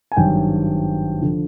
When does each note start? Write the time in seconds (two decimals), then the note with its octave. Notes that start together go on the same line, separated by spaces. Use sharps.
0.12 G#5
0.16 G#1 G2 D#3 F#3 G5
1.21 D3 F3